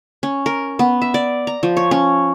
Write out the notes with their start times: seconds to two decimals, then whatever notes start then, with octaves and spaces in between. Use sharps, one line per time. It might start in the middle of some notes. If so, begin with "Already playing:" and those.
0.23 C#4
0.46 A#4
0.79 B3
1.02 E5
1.14 D5
1.47 A#5
1.63 F3
1.77 C#5
1.91 C#4